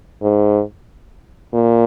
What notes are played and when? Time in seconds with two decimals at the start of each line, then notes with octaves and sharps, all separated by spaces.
0.22 G#2
1.53 A#2